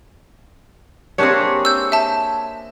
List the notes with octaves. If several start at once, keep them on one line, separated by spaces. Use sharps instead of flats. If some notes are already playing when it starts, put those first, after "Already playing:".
A#3 C4 D4 G4 G#4 C#5
E6 G6
E5 A5